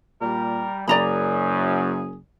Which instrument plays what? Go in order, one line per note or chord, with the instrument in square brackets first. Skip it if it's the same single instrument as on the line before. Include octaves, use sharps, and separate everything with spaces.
[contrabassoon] A#2 [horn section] G3 [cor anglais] A#4
[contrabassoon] F#1 [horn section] F#2 [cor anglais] G#4 [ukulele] D5 A#5 B5